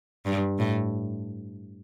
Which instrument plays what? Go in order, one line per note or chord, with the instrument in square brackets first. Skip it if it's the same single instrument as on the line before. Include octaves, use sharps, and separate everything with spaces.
[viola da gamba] G2
A2